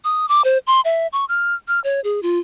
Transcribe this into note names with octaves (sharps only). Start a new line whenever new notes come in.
D#6
D6
C5
C6
E5
C#6
F6
F6
C#5
G#4
F4